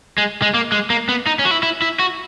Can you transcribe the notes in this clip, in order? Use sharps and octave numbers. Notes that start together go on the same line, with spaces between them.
G#3
G#3
A#3
G#3
A#3
B3
D#4
C#4
F#4
E4
E4
E4
F#4